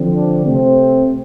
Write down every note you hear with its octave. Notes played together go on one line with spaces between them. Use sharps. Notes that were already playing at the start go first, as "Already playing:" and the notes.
Already playing: D3 F3 C4
D4
C3 A3 C4